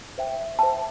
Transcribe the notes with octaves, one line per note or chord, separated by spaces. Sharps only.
C5 E5 G5
C5 E5 G5 A5